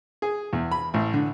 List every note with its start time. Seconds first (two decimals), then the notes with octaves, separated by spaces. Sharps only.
0.22 G#4
0.53 E2
0.72 B5
0.94 A1
1.14 D3